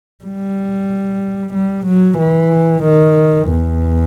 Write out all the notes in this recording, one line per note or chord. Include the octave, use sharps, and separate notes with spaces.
G3
G3
F#3
E3
D#3
E2